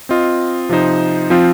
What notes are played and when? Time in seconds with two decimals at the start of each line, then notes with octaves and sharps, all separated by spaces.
0.09 C4 F4 D#5
0.69 C3 F3 D#4 C5
1.30 F3 C4 F4